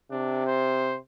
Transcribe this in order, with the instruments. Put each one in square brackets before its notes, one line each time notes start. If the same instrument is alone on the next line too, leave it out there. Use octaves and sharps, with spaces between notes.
[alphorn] C3 [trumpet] D4
[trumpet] C5